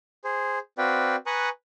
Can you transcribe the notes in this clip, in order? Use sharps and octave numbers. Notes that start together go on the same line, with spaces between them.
G#4 C5
C4 F#4 B4 D5 F5 G5
B4 G#5 A#5 C#6 D#6 F#6